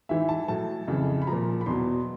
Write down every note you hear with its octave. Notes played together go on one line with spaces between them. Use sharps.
G#2 E3 E5
A5
A2 F#3 A5
F2 C#3 E3
B5
A#2 F3 A#5
B5
E2 B2 F#3 C6